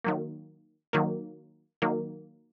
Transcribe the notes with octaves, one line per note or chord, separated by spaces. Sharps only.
D#3 F#3 A#3
D#3 F#3 A#3
D#3 F#3 A#3